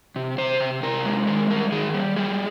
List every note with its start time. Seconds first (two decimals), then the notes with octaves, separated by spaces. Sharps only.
0.16 C3
0.38 C3 C5
0.60 C3
0.83 C3 A#4
1.05 G#3
1.27 D#3 A#4
1.50 G3 A#4
1.72 D#3 G#4
1.94 G3
2.17 G3 G#4